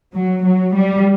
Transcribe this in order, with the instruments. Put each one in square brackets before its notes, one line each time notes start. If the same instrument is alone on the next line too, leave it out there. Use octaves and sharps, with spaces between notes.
[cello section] F#3
F#3
G3